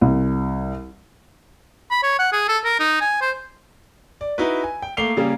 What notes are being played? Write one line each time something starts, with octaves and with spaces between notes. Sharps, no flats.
C2
B5
C#5
F#5
G#4
A4
A#4
D#4
G#5
C5
D5
D#4 E4 F#4 B4
G#5
G5
A3 A#3 D6 C7 F7 G7
C#3 G3 A#3 G#4